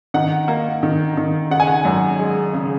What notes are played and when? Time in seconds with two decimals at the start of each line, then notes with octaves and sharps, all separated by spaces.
0.14 D#3 F#5
0.48 A#3
0.83 D#3
1.17 D#3
1.51 C#3 F#5
1.60 G#5
1.67 F#5
1.85 F#2
2.19 G#3
2.54 C#3